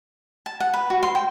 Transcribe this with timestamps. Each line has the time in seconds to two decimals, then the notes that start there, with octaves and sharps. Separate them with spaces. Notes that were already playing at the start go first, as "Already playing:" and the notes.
0.46 A5
0.60 F#5
0.74 B4
0.90 F#4
1.03 C6
1.15 G5